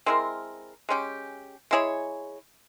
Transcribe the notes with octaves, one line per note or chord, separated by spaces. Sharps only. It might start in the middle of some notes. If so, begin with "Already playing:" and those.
G#3 C4 E4 A#4
G#3 C#4 G4
G#3 E4 G#4 C#5